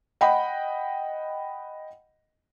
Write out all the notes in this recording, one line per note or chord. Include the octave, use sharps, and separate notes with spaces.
D#5 F#5 G5 B5